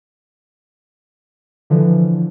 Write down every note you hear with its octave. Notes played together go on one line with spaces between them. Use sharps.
D3 E3 F3